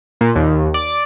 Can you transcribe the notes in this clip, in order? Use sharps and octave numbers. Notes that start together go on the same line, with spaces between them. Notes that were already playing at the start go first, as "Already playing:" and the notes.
A#2
D#2
D5